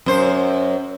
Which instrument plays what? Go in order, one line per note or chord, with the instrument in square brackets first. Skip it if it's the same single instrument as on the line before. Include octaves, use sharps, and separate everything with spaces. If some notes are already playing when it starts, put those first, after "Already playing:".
[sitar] F#2 C5